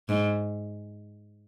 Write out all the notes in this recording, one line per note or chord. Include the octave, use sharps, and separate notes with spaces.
G#2